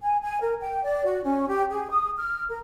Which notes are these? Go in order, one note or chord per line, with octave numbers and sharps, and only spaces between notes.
G#5
G#5
A#4
G5
D5
F#4
C#4
G4
G#4
D#6
F6
A#4